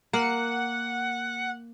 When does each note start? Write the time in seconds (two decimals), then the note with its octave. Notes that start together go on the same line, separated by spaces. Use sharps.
0.13 A#3 F#5